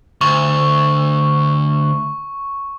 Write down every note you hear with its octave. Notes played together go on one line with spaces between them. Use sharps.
D2 C#6